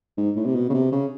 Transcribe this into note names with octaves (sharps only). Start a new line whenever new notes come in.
G#2
A2
C3
B2
C#3
C3
C#3